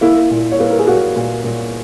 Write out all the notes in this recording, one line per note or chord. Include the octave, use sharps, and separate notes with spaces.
A#3 E4
A#2
C#5
A#3 B4
A#4
G#4
A#3 F#4
A#2
A#2